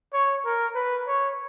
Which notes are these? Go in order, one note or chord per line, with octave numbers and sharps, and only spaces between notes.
C#5
A#4
B4
C#5